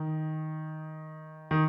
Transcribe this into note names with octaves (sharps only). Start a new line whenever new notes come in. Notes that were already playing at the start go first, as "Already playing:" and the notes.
Already playing: D#3
D#3